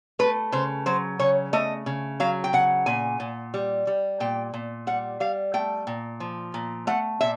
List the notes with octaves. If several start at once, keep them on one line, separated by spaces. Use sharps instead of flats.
A3 B4
C#3 C5
F#3 C5
C#3 C#5
A3 D#5
C#3
F#3 F5
G5
C#3 F#5
A#2 G#5
A#2
G3
G3
A#2 G5
A#2
G3 F#5
G3 F5
A3 G5
A#2
F3
A#2
A3 F#5
A#2 E5